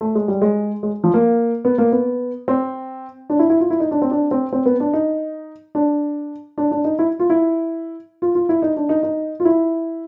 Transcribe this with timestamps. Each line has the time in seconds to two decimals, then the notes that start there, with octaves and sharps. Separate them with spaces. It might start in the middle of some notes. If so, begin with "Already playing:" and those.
0.01 A3
0.15 G#3
0.28 G3
0.42 G#3
0.83 G#3
1.04 F3
1.14 A#3
1.65 B3
1.78 A#3
1.92 B3
2.48 C4
3.30 D4
3.39 E4
3.50 E4
3.61 F4
3.70 E4
3.80 D#4
3.91 D4
4.02 C4
4.11 D4
4.31 C4
4.53 C4
4.66 B3
4.80 D4
4.94 D#4
5.75 D4
6.58 D4
6.71 D4
6.84 D#4
6.99 E4
7.20 F4
7.30 E4
8.22 F4
8.35 F4
8.49 E4
8.62 D#4
8.77 D4
8.89 D#4
9.03 D#4
9.40 F4
9.45 E4